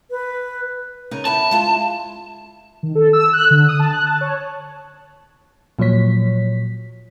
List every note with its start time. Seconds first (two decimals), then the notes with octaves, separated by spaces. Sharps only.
0.11 B4
1.11 C#3 D#4 A#4
1.25 B3 E4 B4 A5
1.51 G#3 F4 E5
2.83 D#3
2.95 A4
3.13 E6
3.33 F#6
3.50 D3
3.68 D#6
3.79 A5
3.93 F#6
4.06 A5
4.21 C#5
5.79 A#2 F3 F#3 C#5 B6